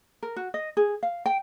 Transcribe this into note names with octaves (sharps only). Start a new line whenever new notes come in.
A#4
F#4
D#5
G#4
F5
G5